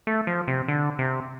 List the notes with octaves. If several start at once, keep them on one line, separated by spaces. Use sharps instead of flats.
A3
F3
C3
D3
C3